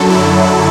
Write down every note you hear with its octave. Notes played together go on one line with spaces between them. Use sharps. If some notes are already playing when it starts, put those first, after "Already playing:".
Already playing: F#2 D3 F#3 A4
E4